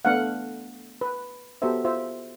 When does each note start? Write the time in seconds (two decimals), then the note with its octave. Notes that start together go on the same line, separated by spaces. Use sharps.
0.05 A3 B3 D4 A4 F5 F#5
1.01 B4
1.62 B3 F#4 G4 A4 C5 E5
1.85 F4 C5 E5